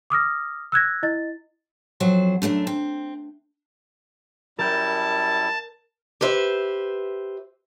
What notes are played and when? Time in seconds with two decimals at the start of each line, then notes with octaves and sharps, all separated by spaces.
0.10 D6 D#6 F6 A#6
0.72 E6 F#6 G#6 A#6
1.03 E4 D#5 A6
2.00 F2 F#3 C5
2.42 F#2 A3 C#4 D4
2.67 C4
4.59 F#2 G3 E4 A#4 A5 G6
6.21 G4 B4 C5 E5